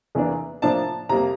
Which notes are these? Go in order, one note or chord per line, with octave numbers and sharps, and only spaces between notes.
E2 E3 A#3 D4
A2 F3 A#3 D4 A5
F2 C3 G3 A#3 A#5